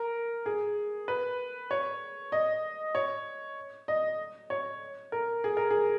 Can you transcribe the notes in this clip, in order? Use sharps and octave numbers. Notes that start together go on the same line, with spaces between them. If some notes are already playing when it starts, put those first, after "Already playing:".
Already playing: A#4
G#4
B4
C#5
D#5
C#5
D#5
C#5
A#4
G#4
A#4
G#4